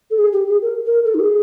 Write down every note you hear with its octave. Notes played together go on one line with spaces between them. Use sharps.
A4
G#4
G4
G#4
A#4
A#4
A4
D#4
G4
G#4